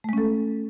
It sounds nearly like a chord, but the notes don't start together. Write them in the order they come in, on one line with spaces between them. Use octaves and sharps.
A3 G#3 C#4 A4